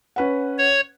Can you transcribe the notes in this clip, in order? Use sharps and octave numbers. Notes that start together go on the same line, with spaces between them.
C#4 B4 F#5
C#5